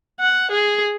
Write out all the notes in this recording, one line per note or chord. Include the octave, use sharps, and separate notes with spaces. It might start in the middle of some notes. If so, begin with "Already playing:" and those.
F#5
G#4